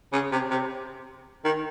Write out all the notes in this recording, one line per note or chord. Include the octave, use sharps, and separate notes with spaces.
C#3
C3
C3
D#3